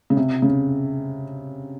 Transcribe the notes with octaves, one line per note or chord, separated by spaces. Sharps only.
C#3
C3
C#3